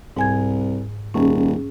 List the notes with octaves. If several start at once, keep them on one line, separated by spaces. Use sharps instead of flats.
C2 G#2 G#5 G#6
D#1 C#4 G#4